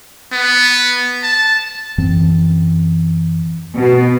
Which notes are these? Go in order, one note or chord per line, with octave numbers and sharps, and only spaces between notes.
B3
A5
F#2 E3 C4
B2